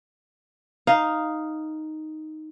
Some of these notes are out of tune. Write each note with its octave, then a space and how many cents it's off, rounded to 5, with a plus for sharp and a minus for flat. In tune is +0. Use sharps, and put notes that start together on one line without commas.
D#4 +0 F5 +0